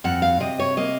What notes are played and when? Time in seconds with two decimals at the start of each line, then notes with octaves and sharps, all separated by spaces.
0.04 F2 F#5
0.22 F5
0.40 C3 D#5
0.60 C#5
0.77 A#3 D#5